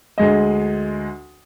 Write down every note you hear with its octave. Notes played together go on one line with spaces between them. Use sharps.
D2 G#3 D#5